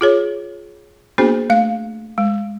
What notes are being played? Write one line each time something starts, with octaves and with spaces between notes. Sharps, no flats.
F4 G#4 C#5
A#3 B3 D4 F#4 G#4 C5
A3 F5
G#3